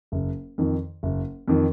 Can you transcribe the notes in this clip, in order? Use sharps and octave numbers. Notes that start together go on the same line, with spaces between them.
F#1
F2 D#3
F#1
F2 D#3